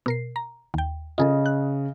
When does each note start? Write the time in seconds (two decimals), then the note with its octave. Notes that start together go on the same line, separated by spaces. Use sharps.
0.06 B2 A#4 C7
0.36 A#5
0.74 D#2 G5
1.18 C#3 F4 G#4 A4 D#5
1.46 F#6